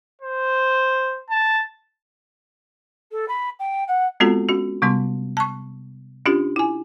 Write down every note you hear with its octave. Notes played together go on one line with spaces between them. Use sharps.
C5
A5
A4
B5
G5
F#5
G#3 B3 C4 F4 F#4 A4
C#4 F#4
C3 G3 B3 C6
A5 C#6
C#4 D4 F4 G4
E4 G#5